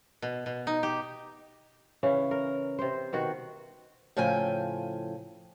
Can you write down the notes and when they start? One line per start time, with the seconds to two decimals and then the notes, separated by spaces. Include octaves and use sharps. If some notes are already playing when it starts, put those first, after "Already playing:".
0.22 B2
0.46 B2
0.67 D#4
0.83 G4
2.03 C#3 E3 C#4
2.31 A#4
2.79 C3 C5
3.13 B2 D#3 F#4
4.17 A2 C#3 F3 G5 G#5